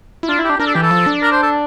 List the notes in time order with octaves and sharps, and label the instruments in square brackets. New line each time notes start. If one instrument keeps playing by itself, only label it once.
[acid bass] E4
[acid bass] D4 [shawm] F4
[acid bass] E4
[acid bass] D4 [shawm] G4
[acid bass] D4 [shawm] A#4
[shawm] A4
[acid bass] E3 [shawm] G4
[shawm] A4
[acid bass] F3
D4
[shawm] A#4
C5
A4